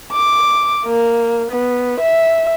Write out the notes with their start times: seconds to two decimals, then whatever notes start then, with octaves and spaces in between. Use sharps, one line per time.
0.12 D6
0.85 A#3
1.51 B3
2.01 E5